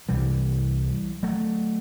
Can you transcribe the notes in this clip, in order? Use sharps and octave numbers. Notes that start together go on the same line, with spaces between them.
C2 C3 E3 G3
F#3 A3